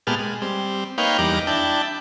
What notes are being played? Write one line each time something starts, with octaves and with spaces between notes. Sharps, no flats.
A#2 G#3 B3 G4 A5 F6
G#3
G3 C4
A#3 D#4 B4 C#5 F5 G5
E2 G3 D#4 A#5 D6
D4 E4 G5 A5